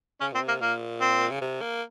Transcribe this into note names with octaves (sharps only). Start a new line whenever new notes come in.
C#3 C#4
A#2 C4
C3
A#3
A#2 A#3
C4
C#3
C3
A#3